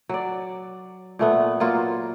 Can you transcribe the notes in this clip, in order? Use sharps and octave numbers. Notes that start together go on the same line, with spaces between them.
F#3 D5
A#2 A3 B3
F#3 A#3 F4